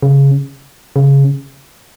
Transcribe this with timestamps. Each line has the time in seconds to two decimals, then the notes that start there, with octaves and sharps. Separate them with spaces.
0.03 C#3
0.96 C#3